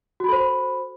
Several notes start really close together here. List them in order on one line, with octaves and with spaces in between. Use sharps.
F#4 B5 A4 C5